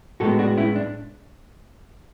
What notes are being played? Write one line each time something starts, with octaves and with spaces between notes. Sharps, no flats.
A2 G#3 B3 F#4 A4
D4 F#4
C#4 E4
D4